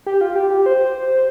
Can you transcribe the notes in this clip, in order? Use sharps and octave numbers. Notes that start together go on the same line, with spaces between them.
G4
F4
G4
G4
C5